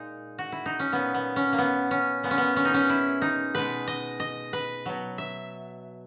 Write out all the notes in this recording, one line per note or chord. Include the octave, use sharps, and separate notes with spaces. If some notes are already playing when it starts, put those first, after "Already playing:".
Already playing: A#2 G#3 D#4
F#4
E4
D#4
C#4
A#2 F#3 B3
B3
C#4
A#3
B3
C#4
A#2 G#3 B3
C#4
B3
C#4
D#4
C#4
E4
D#4
B2 G#3 B4
D#5
D#5
B4
B2 F#3
E5